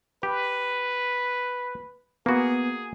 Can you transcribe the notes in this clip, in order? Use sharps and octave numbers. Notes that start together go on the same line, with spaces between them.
G4 B4
A#3 B3 F#4 G#4